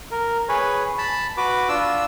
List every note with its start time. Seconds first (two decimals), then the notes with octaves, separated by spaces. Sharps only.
0.11 A#4
0.49 G#4 B4 C#5
0.98 A5 B5
1.38 F#4 B4 D6
1.69 D4 F4 E6